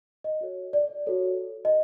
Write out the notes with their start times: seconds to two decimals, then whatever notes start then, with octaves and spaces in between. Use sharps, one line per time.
0.24 D#5
0.41 F#4 A4 C#5
0.73 D5
1.07 F#4 A4 C#5
1.65 D#5